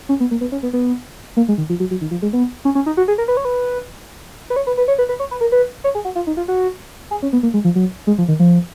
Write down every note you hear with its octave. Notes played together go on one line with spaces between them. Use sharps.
C#4
B3
A#3
B3
C#4
B3
B3
A#3
G#3
D#3
F3
F#3
F#3
D#3
F3
G#3
B3
C#4
C#4
D#4
F#4
G#4
A#4
B4
C#5
B4
B4
C#5
B4
B4
C#5
B4
B4
C#5
B4
A#4
B4
C#5
G#4
F#4
F4
D#4
F4
F#4
G#4
C#4
B3
A#3
G#3
F3
F#3
G#3
F3
D#3
F3